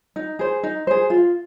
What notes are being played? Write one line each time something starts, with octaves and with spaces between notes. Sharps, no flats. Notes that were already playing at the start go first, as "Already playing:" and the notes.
D#4
G#4 C5
D#4
G#4 C5
F4